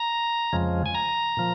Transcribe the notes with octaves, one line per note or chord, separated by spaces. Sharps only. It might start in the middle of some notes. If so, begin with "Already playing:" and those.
Already playing: A#5
F2 C#3 F3 G#3
G#5
A#5
A#2 F3